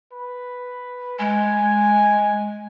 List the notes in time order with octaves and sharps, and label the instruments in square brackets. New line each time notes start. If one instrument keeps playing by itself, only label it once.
[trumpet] B4
[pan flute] G#3 [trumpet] G#5